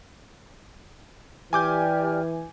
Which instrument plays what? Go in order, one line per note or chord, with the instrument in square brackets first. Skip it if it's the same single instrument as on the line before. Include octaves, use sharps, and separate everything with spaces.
[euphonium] E3 [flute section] G4 D5 F6 [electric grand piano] G#5 D6 G6